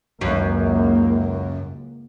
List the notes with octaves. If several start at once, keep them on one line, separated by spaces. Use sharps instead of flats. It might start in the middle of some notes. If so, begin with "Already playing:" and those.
C#2 F#2 D#3 A#3